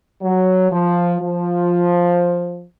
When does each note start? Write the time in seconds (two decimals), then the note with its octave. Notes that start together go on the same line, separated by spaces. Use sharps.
0.22 F#3
0.72 F3
1.21 F3